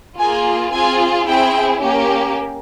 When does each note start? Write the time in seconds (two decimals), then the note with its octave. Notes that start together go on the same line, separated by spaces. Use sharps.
0.19 A#3 F4 G#4 G#5
0.72 C4 F4 G#4 G#5
1.26 C4 E4 G#4 G5
1.80 A#3 C#4 G4